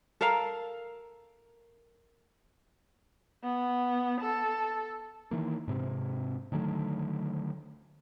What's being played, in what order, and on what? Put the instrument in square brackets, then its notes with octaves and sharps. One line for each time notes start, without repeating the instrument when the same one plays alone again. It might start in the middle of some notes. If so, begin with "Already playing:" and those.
[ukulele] A4 A#4 F5 A#5
[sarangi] B3
A4
[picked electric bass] D#3 E3 A#3
G#2 C3 C4
D3 D#3 F#3 A3